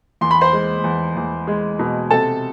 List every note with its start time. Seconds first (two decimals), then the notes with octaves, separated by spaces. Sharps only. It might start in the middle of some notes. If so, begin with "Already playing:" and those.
0.21 E2 C6
0.31 B5
0.41 C5 C6
0.53 G#3
0.84 E2
1.17 E2
1.47 G#3
1.79 B2
2.10 C3 A4 A5